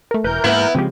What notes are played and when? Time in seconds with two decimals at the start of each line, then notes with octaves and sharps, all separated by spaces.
0.11 A3 A#4
0.24 E1 E3 A#4 B4 G6
0.44 G#2 A#3 B3 E4
0.75 C#3 F3 G#3 C4 G4